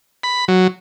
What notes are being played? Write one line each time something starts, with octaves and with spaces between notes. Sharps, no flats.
B5
F#3